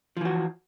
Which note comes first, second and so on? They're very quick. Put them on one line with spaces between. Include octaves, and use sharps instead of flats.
F3 E3 F#4